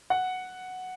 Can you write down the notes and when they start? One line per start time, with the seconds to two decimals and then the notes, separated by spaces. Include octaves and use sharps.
0.10 F#5